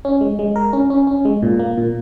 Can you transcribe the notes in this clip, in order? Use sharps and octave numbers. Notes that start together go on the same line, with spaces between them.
C#4
G#3
G#3
A#4
C#4
C#4
C#4
G#3
A#2
A#3
A#2